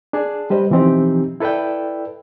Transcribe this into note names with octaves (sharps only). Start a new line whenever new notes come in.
D4 G#4 A5
G3 G4 B4 C5 D#5
B2 E3 F3 C4 D#4 G4
E4 A4 B4 D5 G5